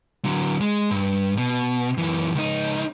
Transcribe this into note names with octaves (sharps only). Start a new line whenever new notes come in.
D3 F#3
G#3
G2
B2
F#2 E3
C#2 D#4